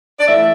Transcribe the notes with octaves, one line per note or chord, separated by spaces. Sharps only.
D5
A2 E3 E5